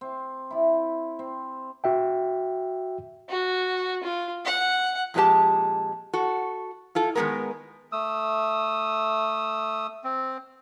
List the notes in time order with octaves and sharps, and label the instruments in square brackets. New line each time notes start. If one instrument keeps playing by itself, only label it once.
[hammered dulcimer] C4
E4 D5
C4
[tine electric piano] F#4 E5 G5
[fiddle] F#4
F4
F#5
[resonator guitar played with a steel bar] F2 A#2 G#3 D4 G4 A5
F#4 A4
E4 F4 A4
D#3 G#3 A#3 B3 G#4 A#4
[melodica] A3 D#6 E6
C4